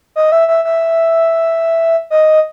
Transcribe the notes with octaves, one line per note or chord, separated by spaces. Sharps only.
D#5
E5
E5
E5
D#5